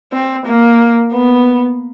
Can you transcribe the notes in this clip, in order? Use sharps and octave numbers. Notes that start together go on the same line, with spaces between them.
C4
A#3
B3